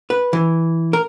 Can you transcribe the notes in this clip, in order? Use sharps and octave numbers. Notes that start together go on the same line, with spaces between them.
B4
E3
A#4